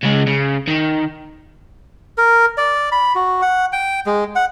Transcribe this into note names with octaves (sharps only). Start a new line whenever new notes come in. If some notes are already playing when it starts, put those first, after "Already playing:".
C#3 G#3
C#3
D#3
A#4
D5
B5
F#4
F#5
G5
G#3
F#5